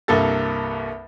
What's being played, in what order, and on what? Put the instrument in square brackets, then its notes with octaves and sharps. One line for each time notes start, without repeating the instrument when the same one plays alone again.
[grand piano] C2 G2 A#3 A4 A6